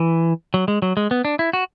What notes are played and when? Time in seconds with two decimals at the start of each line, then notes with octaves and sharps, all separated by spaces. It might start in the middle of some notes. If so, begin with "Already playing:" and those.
Already playing: E3
0.54 F#3
0.68 G#3
0.82 F#3
0.97 G#3
1.11 B3
1.25 D4
1.39 E4
1.53 F#4